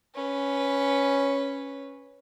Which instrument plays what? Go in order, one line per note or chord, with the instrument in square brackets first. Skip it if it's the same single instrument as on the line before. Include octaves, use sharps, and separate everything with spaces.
[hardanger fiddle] C#4 B4